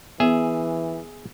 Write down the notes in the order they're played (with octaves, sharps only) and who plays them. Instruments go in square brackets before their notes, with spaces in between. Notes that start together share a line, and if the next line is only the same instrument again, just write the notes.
[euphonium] E3 [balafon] B3 [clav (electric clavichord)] G#4 E5